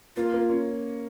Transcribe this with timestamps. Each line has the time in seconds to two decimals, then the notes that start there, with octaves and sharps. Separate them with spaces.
0.16 A#3 F4
0.34 A#3
0.50 C#4